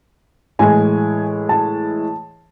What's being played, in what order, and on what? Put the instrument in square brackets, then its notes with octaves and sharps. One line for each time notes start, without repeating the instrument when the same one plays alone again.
[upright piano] A2 E3 G#3 G#5
A5